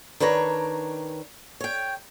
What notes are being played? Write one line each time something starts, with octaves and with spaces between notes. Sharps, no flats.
D#3 D4 B4 C#5 A#5
C#5 G5